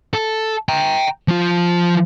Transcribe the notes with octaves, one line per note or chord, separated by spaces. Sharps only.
A4
G5 A#5
F3 F4